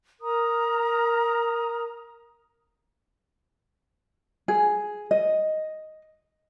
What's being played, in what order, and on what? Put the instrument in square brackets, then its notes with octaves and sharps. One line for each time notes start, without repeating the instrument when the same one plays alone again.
[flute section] A#4 A#5 D#6
[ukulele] G#4
D#5